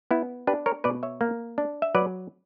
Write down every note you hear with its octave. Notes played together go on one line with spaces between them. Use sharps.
B3 E4
D4 G4 B4
A#4 C#5
B2 B4 D5
C#5 E5
A#3
D4
E5
F#3 B4 D5